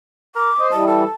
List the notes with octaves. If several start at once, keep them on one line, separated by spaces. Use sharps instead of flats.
A#4 D6
C5 D#5
E3 G3 A5
A4 A5